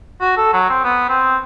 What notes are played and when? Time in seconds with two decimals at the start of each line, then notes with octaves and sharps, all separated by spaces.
0.21 F#4
0.37 A4
0.53 F#3
0.69 C4
0.84 B3
1.09 C4